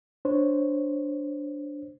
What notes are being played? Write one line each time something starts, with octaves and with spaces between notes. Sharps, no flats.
D4 C5 C#5